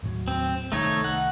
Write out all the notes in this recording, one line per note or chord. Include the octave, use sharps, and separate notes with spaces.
D#2 A2 F#3
C4
C2 D#3 A3 D#4 C#5
F#5